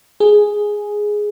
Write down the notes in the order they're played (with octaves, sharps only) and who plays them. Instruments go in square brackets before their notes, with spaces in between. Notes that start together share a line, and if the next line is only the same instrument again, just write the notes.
[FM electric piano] G#4